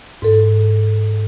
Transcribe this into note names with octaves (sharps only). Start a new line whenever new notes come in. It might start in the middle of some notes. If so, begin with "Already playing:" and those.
G#2 A4